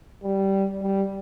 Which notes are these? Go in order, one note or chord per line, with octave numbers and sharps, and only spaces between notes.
G3
G3